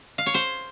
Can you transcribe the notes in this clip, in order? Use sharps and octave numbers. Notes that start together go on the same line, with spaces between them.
F5
C#5
C5